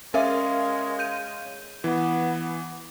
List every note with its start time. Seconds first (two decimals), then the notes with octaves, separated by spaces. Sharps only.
0.14 G#3 C#4 A#4 E5 F5
0.99 G6 D#7
1.84 E3 B3